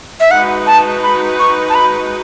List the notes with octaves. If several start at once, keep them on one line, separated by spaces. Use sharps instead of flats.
E5
G#3 D#4 F#4 B4 F#5
A5
B5
C#6
A5
B5